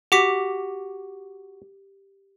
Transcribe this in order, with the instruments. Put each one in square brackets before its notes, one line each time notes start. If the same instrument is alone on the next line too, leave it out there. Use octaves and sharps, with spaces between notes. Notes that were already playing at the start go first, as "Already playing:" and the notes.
[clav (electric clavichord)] F#4 [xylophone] G4 D6 B6